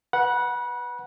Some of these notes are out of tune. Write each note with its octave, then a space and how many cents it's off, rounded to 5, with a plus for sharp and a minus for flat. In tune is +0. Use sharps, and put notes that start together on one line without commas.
B4 +0 F#5 +0 B5 -35